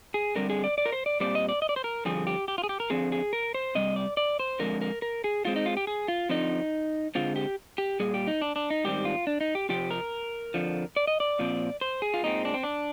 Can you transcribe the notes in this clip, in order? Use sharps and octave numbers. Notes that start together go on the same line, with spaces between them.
G#4
D3 G3 C4 A#4
G#4
D5
D5
A#4
C5
D5
A#2 G3 C4 D5
D#5
D5
D#5
D5
C5
A#4
G2 D3 F3 C4 G#4
G4
G4
F4
G#4
G4
A#4
D3 F3 C4 G#4
G#4
A#4
C5
C3 G3 D#5
D5
D5
C5
D3 F3 G#3 C4 A#4
A#4
A#4
G#4
D3 G#3 C4 F4
D#4
F4
G4
G#4
F4
D3 F3 C4 D#4
D3 G#3 C4 F4
G4
G4
A#2 G3 G#4
G4
D#4
D4
D4
D#4
G#2 D#3 G3 C4 G4
F4
D4
D#4
G4
C3 F3 C4 G4
A#4
F2 D3 F3
D5
D#5
D5
A#2 F3 C4
C5
G#4
F4
A#2 G#3 C4 D#4
D4
C4
D4